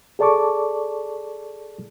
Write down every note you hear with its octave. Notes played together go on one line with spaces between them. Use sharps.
G#4 A4 D5 A5 C#6 D6